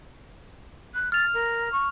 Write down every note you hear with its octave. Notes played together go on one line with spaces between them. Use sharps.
F#6
F6 A6 F7
A#4
C#6